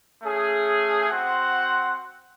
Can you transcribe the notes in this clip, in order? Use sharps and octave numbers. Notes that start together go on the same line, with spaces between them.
A3 C#4 G#4
C4 F#4 C5 F#5